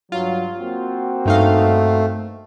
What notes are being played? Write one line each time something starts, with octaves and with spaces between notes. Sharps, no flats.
G2 F#3 F4
A#3 C4 F#4
G2 A3 D#4 F5